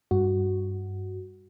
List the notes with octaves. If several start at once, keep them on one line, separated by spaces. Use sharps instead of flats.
G2 F#4